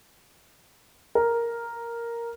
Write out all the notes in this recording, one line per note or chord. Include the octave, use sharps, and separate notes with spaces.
A#4